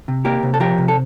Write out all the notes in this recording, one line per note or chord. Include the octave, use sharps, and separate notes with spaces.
C3
A#3 G4 A#4
C3
A4
F3 G4 A#4
C3
A4